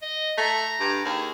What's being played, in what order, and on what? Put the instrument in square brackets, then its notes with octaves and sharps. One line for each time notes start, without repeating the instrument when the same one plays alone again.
[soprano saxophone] D#5
[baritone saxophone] A3 [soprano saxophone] A#5
[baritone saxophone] G2
[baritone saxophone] D#2 [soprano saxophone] G#4